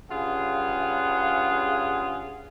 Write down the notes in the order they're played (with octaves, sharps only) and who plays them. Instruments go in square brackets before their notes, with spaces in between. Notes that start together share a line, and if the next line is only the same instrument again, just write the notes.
[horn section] G2 C#3 F4 G#4 F#5